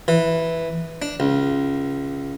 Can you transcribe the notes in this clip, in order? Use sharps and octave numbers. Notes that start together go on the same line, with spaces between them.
E3
D4
C#2